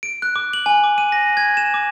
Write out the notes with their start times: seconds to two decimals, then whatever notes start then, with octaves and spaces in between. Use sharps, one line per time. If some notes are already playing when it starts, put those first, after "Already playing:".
0.03 D7
0.22 F#6
0.36 D6
0.53 F#7
0.66 G#5
0.84 D6
0.98 D#7
1.12 A#6
1.37 G#6
1.57 E7
1.74 D6